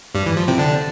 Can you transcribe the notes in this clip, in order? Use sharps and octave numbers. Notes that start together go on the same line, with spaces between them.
G2 G3
E3
F3
C3 C4
D3 D4